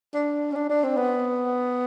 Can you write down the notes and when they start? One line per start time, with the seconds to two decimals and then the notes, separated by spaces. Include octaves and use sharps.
0.14 D4
0.52 C#4
0.56 D4
0.69 D4
0.84 C4
0.97 B3